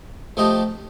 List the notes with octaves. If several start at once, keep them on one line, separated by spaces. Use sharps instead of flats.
F3 A3 D#4 G4